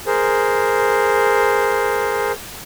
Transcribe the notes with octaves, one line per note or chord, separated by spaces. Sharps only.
G#4 A#4 C5